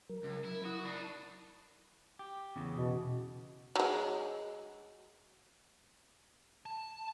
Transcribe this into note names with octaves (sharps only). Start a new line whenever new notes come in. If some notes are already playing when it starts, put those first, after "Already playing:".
F#3 A#4
C#2
E4
E4 F#4 D#6
D4 D#4 B5
G4
E2 C#3
B2
F#3 G#3
A5